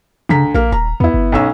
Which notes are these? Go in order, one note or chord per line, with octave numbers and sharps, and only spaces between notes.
D2 C#3 A#5 B6
A#1 A#3 A#4
D#1 A#5
E2 B3 E4
G1
B1 C#4 E6